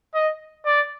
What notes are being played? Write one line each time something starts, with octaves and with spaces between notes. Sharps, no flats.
D#5
D5